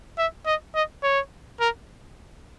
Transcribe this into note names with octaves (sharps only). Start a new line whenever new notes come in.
E5
D#5
D#5
C#5
A#4